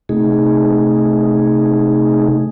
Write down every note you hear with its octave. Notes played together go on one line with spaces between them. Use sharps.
C3 A3 D#4 G#4